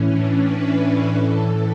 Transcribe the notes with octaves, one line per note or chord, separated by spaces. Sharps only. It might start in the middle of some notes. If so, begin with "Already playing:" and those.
Already playing: A2 E3 C#4
D4
B4
B4
A2 E3 A4